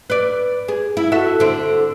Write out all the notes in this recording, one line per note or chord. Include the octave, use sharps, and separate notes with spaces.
B4 D5
G#4
E4
F#4 A4 E5
D3 C4